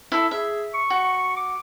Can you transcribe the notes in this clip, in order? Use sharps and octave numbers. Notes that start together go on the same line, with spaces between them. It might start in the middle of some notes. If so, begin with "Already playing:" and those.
E4 A4
G#4 E5
C#6
F#4
D6